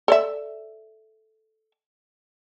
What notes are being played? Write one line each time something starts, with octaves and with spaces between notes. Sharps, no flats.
A4 D5 E5